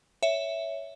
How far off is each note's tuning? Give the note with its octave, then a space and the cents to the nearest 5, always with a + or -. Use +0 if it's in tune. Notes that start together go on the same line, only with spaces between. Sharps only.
C#5 +10 E5 +0